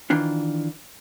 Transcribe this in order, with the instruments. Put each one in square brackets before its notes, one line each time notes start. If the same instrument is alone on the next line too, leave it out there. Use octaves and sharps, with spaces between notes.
[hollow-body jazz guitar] D#3 E3 D4 F4